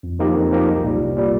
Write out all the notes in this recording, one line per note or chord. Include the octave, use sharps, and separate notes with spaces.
F2
F3 A#3 D#4 G4
F2
F3 A#3 D#4 G4
C2
A#2 G3
C2
A#2 G3